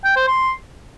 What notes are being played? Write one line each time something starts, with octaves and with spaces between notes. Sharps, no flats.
G5
C5
C6